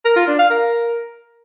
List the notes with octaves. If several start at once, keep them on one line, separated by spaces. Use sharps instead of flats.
A#4
F4
D4
F5
A#4